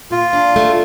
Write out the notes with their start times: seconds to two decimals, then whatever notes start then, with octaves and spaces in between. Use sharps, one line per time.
0.11 A#2 F4
0.33 D4
0.56 A3